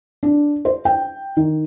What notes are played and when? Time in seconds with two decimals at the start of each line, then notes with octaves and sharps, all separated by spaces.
0.23 D4
0.65 C5
0.85 G5
1.37 D#3